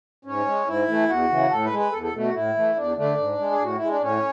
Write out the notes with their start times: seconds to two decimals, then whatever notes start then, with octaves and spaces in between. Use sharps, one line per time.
0.25 G#2 C#4
0.46 G#3
0.67 G#2 E4
0.88 E3 A3
1.08 E2 F#4
1.30 C#3 E3
1.50 A2 A4
1.65 B4
1.71 G#3
1.79 B4
1.92 E2 A4
2.02 A4
2.13 B2 A3
2.24 F#4
2.34 A2 E4
2.55 E3 A3
2.76 E2 D4
2.97 D3 A3 D4
3.18 G#2
3.39 G#3
3.51 G#4
3.59 A2 F#4
3.76 G#3 E4
3.89 D4
4.01 A2 C#4